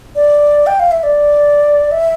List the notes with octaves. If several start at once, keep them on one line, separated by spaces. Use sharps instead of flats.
D5
G5
F5
E5
D5
E5